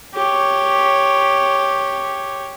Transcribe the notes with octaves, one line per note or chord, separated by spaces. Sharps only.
G4 C#5